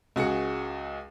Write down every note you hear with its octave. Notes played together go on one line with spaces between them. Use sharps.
C#2 F#4 G#4 C#7